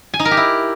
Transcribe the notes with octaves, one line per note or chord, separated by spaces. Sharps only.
G#5
D#4
A#4
G4
E4